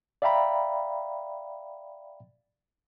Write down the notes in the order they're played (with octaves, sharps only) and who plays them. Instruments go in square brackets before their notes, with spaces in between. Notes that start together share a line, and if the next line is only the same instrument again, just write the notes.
[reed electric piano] D5 E5 F5 G5 A#5 B5